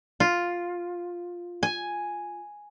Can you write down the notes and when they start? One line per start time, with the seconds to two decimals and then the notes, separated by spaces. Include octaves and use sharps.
0.20 F4
1.63 G#5